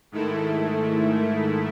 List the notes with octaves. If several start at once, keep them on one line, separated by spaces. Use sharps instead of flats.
G#2 D#3 A3 E4